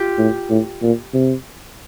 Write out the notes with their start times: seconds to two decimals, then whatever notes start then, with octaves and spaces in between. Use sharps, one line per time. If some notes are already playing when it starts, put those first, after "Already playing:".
Already playing: F4 G4
0.18 A2
0.50 A2
0.82 A#2
1.14 C3